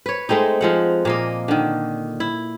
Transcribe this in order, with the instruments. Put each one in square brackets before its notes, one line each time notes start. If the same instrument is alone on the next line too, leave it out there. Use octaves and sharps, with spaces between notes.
[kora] B4 C#5
G#3 A3 C4 D#4
F3 G#3 F#5
A#2 A#3 D#5
D3 D#3
E4